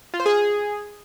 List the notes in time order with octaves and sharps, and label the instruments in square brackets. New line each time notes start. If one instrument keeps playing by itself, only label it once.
[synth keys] F4
C5
G#4